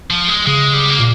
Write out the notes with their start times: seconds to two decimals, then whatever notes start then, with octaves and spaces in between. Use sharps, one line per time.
0.10 F3
0.28 G#3
0.46 C#3 G#3
0.73 G3
0.90 A#3
0.99 A#2